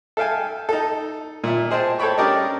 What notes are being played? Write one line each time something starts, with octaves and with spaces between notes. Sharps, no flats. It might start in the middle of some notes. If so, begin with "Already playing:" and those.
A4 E5 F5 G5 G#5
D#4 A4
A#2 E5
G#4 C5 D#5 G5 A5
A4 C5 C#5 G5 B5 C#6
C#4 D4 G4 A#4 D5 D#5